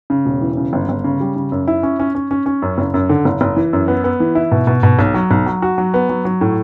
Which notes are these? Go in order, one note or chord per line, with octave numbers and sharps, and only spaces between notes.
C#3
E1
E3
C#3
G1
G1
C#3
G3
C#3
F#2
E4
C#4
C#4
C#4
C#4
C#4
F#2
F#1
F#2
D3
F#1
F#1
E3
F#2
B3
B3
E3
E4
B2
B2
B2
B1
F#3
B1
F#3
F#4
F#3
B3
F#3
F#3
A2